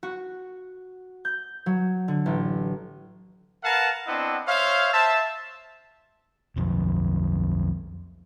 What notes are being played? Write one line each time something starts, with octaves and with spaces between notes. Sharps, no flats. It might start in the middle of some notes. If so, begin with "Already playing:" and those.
F#4
G6
F#3
D3
A1
A#4 B4 F5 F#5 A5 A#5
B3 C4 D4 E4 D#5 F#5
C5 C#5 E5 F5
C5 E5 A5
B1 F2